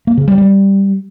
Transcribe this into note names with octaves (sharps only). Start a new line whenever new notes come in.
A#3
C#3
G3
G3